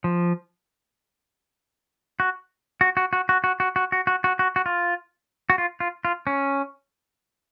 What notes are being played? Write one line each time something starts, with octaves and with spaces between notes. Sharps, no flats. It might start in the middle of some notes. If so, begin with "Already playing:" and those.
F3
F#4
F#4
F#4
F#4
F#4
F#4
F#4
F#4
F#4
F#4
F#4
F#4
F#4
F4
F#4
F4
F4
F4
C#4